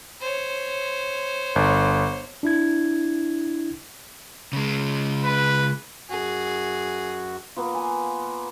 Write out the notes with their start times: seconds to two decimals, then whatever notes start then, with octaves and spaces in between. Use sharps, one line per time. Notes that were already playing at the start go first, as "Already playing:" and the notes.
0.21 C5 C#5
1.56 G1
2.43 D4 E4 G#6
4.53 C#3 G#3
5.25 B4
6.10 F#2 F#4 G#4
7.57 A#3 B3 F4
7.74 G#5